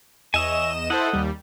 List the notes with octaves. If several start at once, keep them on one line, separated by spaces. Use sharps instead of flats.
E2 C#5 D#5 E5 G#5 E7
E4 A4 C5 D#5 F#5
D#2 G3